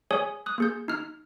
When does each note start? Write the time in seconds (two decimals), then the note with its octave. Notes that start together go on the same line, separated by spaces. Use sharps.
0.11 G#4 C#5 G#5 D#6
0.46 D#6 F#6
0.58 A#3 G#4 G6
0.88 D#4 F6